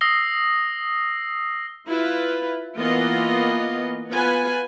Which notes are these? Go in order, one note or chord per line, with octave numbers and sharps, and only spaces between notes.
D#6 E6 A#6 C7 G7
E4 F4 B4
E3 A#3 B3 F4 D#5
B3 F4 B4 G#5